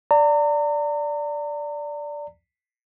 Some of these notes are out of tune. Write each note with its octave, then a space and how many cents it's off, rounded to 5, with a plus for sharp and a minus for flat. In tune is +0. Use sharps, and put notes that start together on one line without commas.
D5 -5 A#5 -40